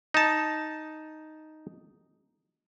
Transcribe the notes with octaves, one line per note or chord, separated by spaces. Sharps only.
D#4 A5